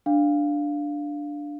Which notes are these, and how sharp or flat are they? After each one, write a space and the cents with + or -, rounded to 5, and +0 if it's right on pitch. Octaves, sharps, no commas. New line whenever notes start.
D4 +0 F5 +0